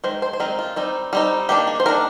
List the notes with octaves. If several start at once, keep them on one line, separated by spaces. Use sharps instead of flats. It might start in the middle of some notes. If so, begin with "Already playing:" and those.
D#3 G#3 C5
C5
C5
D#3 G#3 C4 D#4 A#4
F4
G3 C4 D#4
G3 C4 D#4
D#3 A#3 D4 G4
G#4
C5
D#3 A#3 D4 A#4